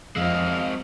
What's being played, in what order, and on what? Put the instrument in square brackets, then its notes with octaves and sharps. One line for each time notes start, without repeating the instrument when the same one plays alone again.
[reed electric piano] F2 E6 [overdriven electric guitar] G#3 C4 [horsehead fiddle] D#5 F5